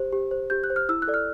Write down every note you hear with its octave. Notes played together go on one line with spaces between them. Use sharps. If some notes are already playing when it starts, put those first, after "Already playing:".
Already playing: G4 C5
G4
C5
G4 G6
F#6
C5
F6
E4 E6
F#6
A4 D5
F6